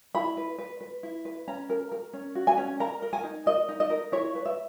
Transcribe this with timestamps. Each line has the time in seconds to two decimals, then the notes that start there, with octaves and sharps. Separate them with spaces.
0.15 E4 B5
0.37 B4
0.58 B4
0.81 B4
1.03 E4
1.25 B4
1.48 C#4 A#5
1.70 A#4
1.92 A#4
2.13 C#4
2.35 F#4
2.47 G#5
2.57 C#4
2.80 A#4 A#5
3.02 A#4
3.13 G#5
3.24 D#4
3.46 A#4 D#5
3.69 D#4
3.80 D#5
3.90 A#4
4.12 E4 C#5
4.35 B4
4.46 E5